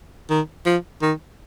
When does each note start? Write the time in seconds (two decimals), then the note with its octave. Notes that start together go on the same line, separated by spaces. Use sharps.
0.30 D#3
0.66 F3
1.01 D#3